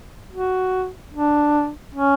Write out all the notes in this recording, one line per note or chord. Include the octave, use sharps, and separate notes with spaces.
F#4
D4
C#4